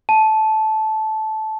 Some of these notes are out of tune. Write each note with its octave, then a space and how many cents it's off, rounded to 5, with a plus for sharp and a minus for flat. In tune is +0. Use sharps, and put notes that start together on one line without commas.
A5 -15